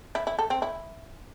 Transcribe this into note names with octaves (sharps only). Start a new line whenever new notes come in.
E4
E4
A4
C4
E4